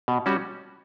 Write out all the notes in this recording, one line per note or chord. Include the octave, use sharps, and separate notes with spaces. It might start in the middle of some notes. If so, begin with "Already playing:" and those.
B2
G3 C#4 F#4